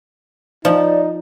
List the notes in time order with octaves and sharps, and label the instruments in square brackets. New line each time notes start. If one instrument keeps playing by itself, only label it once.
[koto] F3 [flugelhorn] D#4 [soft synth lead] D5